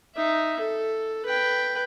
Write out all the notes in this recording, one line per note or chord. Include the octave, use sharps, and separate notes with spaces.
D#4 E5
A4
B4 G5